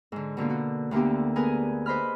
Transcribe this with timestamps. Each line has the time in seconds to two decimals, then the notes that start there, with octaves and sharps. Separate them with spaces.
0.12 G#2 D3
0.37 B2 D3 A#3 F4
0.50 F#4
0.91 D2 D3 A#3 B3 G4
1.36 B3 G#4 A#4 B4 G#5
1.86 B4 C5 D#5 B5 F6